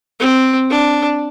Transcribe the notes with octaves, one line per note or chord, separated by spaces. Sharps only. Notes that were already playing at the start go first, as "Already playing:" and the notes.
C4
D4